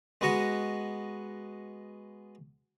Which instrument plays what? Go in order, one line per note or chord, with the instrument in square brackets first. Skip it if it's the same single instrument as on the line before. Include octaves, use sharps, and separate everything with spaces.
[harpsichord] G#3 B3 F#4 D#5 F#5